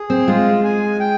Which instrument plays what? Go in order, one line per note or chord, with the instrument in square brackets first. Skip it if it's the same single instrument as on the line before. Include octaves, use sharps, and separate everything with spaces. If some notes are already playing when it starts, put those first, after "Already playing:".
Already playing: [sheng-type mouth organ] G#4
[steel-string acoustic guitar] C4
[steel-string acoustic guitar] G#3 [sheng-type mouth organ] F4
[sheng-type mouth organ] G#5
G5